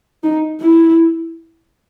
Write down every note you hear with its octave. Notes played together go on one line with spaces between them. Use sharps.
D#4
E4